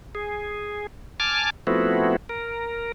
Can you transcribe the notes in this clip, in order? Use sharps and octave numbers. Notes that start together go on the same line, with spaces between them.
G#4
G#5 A5 D6 F6
F3 A3 B3 C4 E4 F#4
A#4